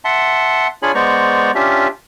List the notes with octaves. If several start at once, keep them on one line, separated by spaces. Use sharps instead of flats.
E5 F#5 A5 C6
D4 F4 G#4 C#5 G#5 B5
G#3 B3 C5 D5 A#5 C#6
C#4 D4 F4 G4 E5